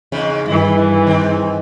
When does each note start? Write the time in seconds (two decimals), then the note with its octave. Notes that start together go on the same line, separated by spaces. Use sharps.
0.12 E2 G#2 C#3
0.47 G2 D#3 E3 E4
1.07 G#2 D#3 C4